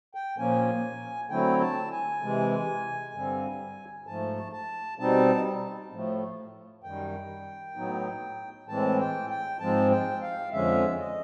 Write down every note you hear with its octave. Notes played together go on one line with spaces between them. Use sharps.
G5
A#2 F3 A#3 C#4 G#5
D3 F#3 A3 C4 E4 G5
A5
G#5
C3 E3 G#3
G2 D3 G3 C4
G#2 F3 A3 A5
A5
B2 G3 C4 D#4 A5
A2 F3 A3
F#2 D#3 G3 G5
A2 F#3 B3 D#4
A2 E3 G#3 C4 A5
G5
G5
G#2 F3 G#3 C4 A5
G5
F5
F2 D3 F3 G#3 C#4 E5
D#5